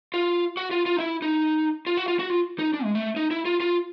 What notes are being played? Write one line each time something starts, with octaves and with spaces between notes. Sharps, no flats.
F4
F#4
F4
F4
D#4
E4
D#4
F4
F#4
F4
F#4
F4
D#4
D4
G#3
A3
D#4
E4
F4
F4